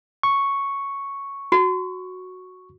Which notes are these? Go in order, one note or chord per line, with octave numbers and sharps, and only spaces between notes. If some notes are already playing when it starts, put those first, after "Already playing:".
C#6
F#4